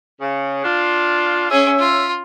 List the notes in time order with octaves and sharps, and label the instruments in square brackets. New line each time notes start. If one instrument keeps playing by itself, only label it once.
[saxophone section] C#3
D4 F4
[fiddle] C#4 G#4 [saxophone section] C#5 E5
[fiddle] F4